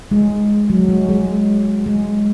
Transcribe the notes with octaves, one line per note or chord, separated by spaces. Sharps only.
G#3
F#3
G#3
G#3
G#3